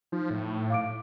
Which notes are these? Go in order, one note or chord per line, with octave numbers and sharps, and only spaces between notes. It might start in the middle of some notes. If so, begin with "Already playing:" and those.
F3 D#4
A2
F5 D6 D7